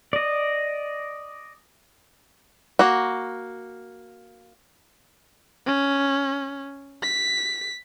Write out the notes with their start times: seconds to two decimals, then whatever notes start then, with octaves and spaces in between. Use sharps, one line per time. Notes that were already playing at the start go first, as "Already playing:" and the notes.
0.13 D5 D#5
2.79 A#3 F#4
5.66 C#4
7.03 B6